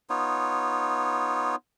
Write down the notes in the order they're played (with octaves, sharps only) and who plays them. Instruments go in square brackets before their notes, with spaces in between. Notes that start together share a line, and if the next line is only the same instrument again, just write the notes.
[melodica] B3 D#4 F4 C#5